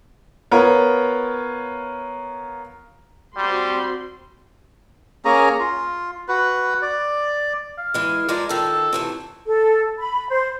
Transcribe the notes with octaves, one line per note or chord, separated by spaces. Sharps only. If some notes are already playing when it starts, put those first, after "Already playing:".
B3 F4 A#4 C#5
G3 C4 F#4 C6
A#3 C#4 G#4 A#5
F4
F#4 B4
D5
F5
E3 G#3
F3 G#3 A#4 D5
D#3 F3 A4
C3 E3 A3
A4
B5
C5